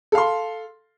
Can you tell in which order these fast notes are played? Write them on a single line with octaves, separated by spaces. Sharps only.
A4 F5 C6